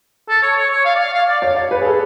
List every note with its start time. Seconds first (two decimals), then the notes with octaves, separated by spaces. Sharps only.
0.29 A4
0.43 C#5
0.57 C#5
0.71 C#5
0.85 F5
0.95 D5
0.99 F5
1.14 F5
1.28 D5
1.42 C#5
1.56 C#5
1.71 B4
1.81 G#4
1.85 A4